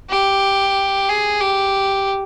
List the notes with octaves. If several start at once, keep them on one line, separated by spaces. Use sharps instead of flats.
G4
G#4
G4